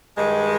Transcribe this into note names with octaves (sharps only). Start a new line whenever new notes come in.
G2 D#3 G#3